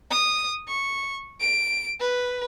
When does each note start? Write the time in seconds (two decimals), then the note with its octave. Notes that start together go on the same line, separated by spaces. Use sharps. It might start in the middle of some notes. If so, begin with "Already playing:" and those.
0.11 D#6
0.68 C#6
1.40 D7
2.00 B4